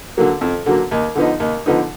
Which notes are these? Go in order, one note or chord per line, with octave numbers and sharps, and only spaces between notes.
D3 F#3 A#3
F2
D3 F#3 A#3
D#2
D3 F3 B3 D#4
D#2
D3 F3 B3 D#4